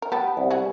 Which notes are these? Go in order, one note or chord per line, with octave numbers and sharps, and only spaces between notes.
A#4
B3 G4 A4
C2
F#4 G#4